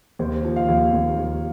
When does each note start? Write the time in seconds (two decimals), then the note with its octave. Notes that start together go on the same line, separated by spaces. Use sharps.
0.19 D#2 C5
0.44 F3
0.56 F5
0.69 D#2
0.94 D#2
1.18 D#2